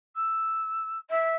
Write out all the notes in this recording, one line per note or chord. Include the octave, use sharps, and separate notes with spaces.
E6
E5